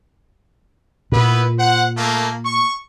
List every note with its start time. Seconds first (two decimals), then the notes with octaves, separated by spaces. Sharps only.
1.12 A#2 B3 E4 B4
1.58 C5 F#5
1.97 A3 A#3
2.44 C#6